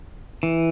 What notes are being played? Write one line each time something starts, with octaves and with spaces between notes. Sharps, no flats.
E3